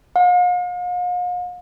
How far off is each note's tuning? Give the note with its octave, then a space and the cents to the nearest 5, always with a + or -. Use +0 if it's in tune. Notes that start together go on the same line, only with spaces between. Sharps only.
F5 +45